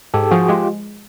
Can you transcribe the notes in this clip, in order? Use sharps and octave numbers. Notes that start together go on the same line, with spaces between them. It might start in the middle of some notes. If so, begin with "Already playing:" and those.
G#2 G4 A4
F3 F#4 G#4
G#3 F4 G4